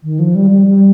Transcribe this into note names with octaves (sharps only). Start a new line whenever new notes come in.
D#3
F3
G3
G3
G3